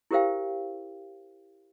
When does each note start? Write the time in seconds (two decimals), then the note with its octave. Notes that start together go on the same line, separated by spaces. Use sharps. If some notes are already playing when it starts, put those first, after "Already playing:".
0.11 E4 G4 A#4 C5 F5 G5